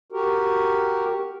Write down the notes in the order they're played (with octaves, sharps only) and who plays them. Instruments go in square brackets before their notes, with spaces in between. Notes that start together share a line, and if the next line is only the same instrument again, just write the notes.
[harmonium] F#4 G4 A#4